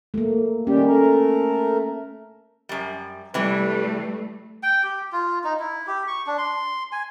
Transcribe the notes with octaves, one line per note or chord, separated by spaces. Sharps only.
A3 A#3
D#3 G3 C#4 G4
A3 A#4
F#2 G3
C3 E3 G3 A3 B4
G5
G4
F4
D#4
E4
G4
C#6
D4
C6
G#5